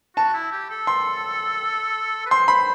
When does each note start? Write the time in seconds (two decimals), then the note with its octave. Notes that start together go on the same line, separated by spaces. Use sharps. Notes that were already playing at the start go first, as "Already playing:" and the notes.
0.17 F#4 A5
0.34 E4
0.52 G4
0.70 A4
0.87 C6
2.26 B4
2.30 C5 C6
2.48 B5